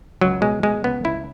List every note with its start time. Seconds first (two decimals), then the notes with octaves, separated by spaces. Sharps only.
0.21 C#2 F#3
0.42 B2 G#3
0.63 B2 G#3
0.84 C#2 B3
1.04 C#2 E4